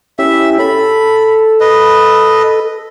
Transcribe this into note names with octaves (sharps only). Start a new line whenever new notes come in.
C#4 E4 G4 E5
A4 B5
B4 D#5